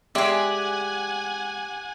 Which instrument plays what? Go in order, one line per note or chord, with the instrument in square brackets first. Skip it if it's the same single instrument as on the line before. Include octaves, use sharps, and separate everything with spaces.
[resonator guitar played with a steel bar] G#3 D5 E5 [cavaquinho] G4 G#4 [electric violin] F#5 G#5